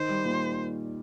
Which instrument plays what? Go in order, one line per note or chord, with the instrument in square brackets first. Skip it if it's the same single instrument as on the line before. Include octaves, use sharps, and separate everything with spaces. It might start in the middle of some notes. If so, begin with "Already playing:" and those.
Already playing: [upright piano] D#3 [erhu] C5
[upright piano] G3
A#2